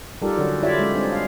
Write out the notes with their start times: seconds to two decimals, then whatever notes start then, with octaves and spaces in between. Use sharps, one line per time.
0.22 G3 D#4 F4 G4 A4 A#4
0.37 D3 F#3 C#4 F#4
0.63 E4 F4 G4 C#5 D5 E5
0.79 G#3 C#4
0.94 G3 C4 D4
1.12 F5